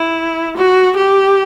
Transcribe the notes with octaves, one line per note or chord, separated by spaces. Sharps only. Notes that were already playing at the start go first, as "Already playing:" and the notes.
Already playing: E4
F#4
G4